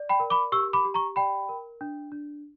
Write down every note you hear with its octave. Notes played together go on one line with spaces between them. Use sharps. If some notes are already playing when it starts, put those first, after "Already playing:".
Already playing: D5
G5 B5
A#4
B5 D6
G4 C#6 E6
B5 D6
G4
A#5 C#6
D5 G5 B5
A#4
D4
D4